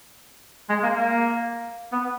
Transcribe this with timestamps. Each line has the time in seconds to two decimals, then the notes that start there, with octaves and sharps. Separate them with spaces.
0.70 G#3
0.83 A#3
0.96 A#3
1.93 B3